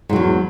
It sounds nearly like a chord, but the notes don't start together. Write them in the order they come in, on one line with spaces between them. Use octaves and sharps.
G#2 F#3 E2